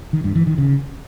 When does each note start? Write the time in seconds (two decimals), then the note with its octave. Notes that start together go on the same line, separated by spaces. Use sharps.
0.13 D#3
0.24 G2
0.35 E3
0.47 D#3
0.58 C#3